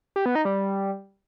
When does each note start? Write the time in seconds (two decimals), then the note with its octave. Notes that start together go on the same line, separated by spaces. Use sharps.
0.16 G4
0.26 B3
0.35 D#4
0.45 G3